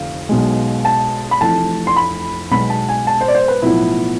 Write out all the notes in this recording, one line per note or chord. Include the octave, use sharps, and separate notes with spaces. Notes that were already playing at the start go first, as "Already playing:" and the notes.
Already playing: F1 F2 D3 F5
B1 B2 G#3
A5
B5
F1 F2 E3 A3 A5
C6
B5
B1 B2 G#3 B3 B5
A5
G#5
A5
C5
D5
C5
B4
B1 A2 F3 B3 E4